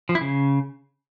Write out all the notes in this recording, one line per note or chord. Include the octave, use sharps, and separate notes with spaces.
F3
E4
C#3